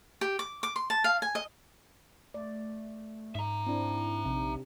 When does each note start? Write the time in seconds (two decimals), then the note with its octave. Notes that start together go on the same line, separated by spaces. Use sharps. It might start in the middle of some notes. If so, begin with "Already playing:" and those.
0.21 G4
0.39 D6
0.63 D6
0.76 C6
0.90 A5
1.04 F5
1.22 G#5
1.35 D#5
2.34 A3 D5
3.35 G#2 E5 A#5
3.66 C4 D4 E4
4.25 A#1 C3 D#4